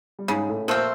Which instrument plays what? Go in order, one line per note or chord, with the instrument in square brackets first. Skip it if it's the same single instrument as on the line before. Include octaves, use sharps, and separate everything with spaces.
[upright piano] G3
[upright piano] G#2 G#3 [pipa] C#3
[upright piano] A2 A3
[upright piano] A#2 A#3 [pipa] F3 A3 C4